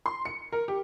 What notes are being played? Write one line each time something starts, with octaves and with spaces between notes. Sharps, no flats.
C6
C#7
A#4
G4